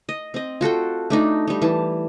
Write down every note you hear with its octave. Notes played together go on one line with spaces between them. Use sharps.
D#5
C4 D#5
F4 F#4 A4 G5
A3 D4 D#4
G3 D#4
E3 A5